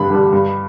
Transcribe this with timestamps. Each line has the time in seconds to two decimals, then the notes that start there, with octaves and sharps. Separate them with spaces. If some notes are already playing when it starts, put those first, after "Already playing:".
Already playing: G2 D3 G3 D4 B5
0.10 D3 G3 D4
0.32 G2